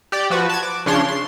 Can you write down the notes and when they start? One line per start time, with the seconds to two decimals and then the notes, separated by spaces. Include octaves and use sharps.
0.12 G4 D5
0.30 F3 F#4 B4
0.49 A5 G#6
0.63 D6
0.86 C#3 F3 D4 C#5 C6
1.09 C6